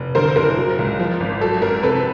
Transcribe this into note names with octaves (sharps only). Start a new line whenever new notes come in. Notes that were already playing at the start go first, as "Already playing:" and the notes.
Already playing: F1
D3 A#4 C5
F#1 A#4
F#3
C#2
F3
G#1
F#3 A4
F#2 A#4
C3 A4 B4